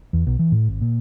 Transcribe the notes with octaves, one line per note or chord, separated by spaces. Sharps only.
E2
B1
E3
A2
G#1
A#2